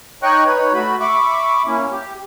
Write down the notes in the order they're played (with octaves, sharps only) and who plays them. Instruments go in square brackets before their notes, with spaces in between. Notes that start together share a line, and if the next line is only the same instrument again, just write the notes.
[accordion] D#4 C#5 D#5 G5 C#6 F#6
D#4 B4 C#5
A3 F#4 B5
E5 B5 C#6 D6
A#3 C#4 E4
G4